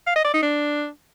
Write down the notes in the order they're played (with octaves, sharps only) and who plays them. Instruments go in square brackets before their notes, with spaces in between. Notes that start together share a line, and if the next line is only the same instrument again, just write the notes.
[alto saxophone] F5
D#5
D5
D#4
D4